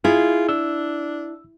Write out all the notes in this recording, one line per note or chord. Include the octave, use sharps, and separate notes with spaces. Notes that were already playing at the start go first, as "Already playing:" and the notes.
E4 F4 G#4
D4 E6